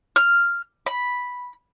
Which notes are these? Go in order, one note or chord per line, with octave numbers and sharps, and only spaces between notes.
F6
B5